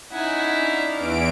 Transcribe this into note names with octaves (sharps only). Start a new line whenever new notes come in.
C#4 D#4 E4 F#5 G#5
D4 F5
E2 E3 D7